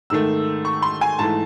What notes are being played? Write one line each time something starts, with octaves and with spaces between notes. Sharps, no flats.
G#2 D#3 A3 E6
C#6
C6
G#5
G#2 E3 A3 A5